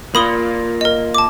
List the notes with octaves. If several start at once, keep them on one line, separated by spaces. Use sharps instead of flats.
A#3 F4 B5 D#6 G7
A#4 D#5
A5 D6